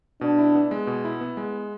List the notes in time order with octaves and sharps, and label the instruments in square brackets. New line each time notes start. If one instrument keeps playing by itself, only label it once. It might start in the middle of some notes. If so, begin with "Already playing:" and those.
[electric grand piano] B2 [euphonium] D4
[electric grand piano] E4
B3
G#3
B2
E4
B3
G#3